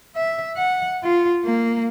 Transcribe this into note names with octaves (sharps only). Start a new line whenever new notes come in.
E5
F#5
F4
A#3